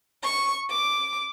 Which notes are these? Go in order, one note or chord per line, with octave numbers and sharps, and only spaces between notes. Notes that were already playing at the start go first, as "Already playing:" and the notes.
C#6
D6